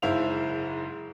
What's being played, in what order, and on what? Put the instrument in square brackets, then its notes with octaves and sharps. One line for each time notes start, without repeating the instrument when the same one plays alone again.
[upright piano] F#1 G#2 E4 C5 F5 F7